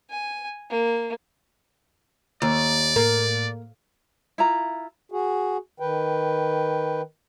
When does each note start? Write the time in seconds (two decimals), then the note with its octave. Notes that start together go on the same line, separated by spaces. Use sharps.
0.10 G#5
0.70 A#3
2.42 D#2 D5
2.96 A2 A#3
4.38 E4 F4 A#5
5.12 F#4 G#4
5.80 D#3 B4 G5